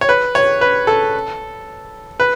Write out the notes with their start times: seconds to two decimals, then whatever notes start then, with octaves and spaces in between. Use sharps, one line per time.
0.01 C#5
0.09 B4
0.35 C#5
0.61 B4
0.87 A4
2.20 B4